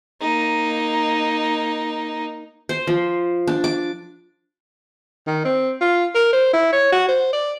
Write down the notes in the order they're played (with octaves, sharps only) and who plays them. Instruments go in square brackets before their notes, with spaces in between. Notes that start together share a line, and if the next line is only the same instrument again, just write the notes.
[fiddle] A#3 D#4
[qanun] C5
F3
D4
D6
[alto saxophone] D#3
C4
F4
A#4
C5
E4
C#5
F#4
C5
D5